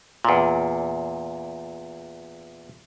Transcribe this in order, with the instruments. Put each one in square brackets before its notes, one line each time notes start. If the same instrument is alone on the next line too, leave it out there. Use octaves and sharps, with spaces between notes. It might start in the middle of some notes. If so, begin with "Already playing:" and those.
[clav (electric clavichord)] E2 A#2